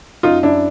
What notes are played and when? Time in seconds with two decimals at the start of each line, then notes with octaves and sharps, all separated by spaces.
0.23 F#2 D#4 F4
0.43 F#2 D4 E4